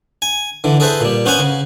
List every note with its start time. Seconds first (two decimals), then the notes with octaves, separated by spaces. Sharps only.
0.22 G#5
0.64 D3 E3
0.80 G#4 A4 B4 C5 E5
1.01 A#2 G3
1.26 B3 C#4 C5 F5 F#5 G#5
1.39 C#3